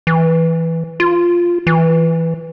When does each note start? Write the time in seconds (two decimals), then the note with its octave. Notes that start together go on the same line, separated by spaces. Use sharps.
0.07 E3
1.00 F4
1.67 E3